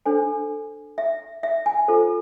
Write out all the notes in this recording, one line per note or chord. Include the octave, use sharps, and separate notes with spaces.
D4 A4 C5 G#5
E5
E5
G#5
F4 A4 C5